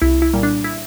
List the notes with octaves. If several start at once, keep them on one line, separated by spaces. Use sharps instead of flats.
C2 E4
E4
A#2 G3 A#3
D4
E4